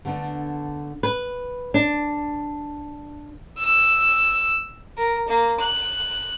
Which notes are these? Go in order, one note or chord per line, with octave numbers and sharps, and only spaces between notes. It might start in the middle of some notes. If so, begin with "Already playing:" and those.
D3 A3 B3 D4
B4
D4
E6
A#4
A#3
F#6